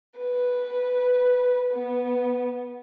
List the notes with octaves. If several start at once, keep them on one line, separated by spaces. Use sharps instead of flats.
B4
B3